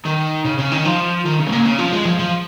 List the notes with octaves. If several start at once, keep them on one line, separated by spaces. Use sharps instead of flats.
D#3
C#3
C#3
D#3
F3
D#3
C#3
G#2
A#2
C#3
F3
G#3
F3
F3